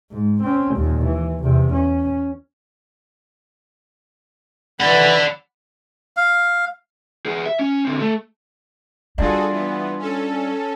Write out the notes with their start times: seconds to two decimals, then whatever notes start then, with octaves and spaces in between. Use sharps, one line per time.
0.11 G#2
0.43 C4 C#4
0.76 D#2 A#2
1.06 E3
1.43 E2 C3
1.73 C#4
4.80 E3 D5 F#5 B5
6.17 F5
7.26 B3 G#4
7.46 E5
7.59 C#4
7.85 D3 C4
8.00 A3 A4
9.18 G3 D4 F4 F#4 G#4 A4
9.52 E3 B3
9.99 C#4 A4